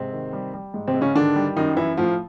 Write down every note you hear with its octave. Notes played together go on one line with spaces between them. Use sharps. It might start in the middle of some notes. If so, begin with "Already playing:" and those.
Already playing: G#2 C3 C4
D#3
G3
G3
G#2
C3 C4
G#2
C#3 C#4
D3 D#3 D4
G3
F#2 D#3 D#4
F#2 E3 E4
A2 F3 F4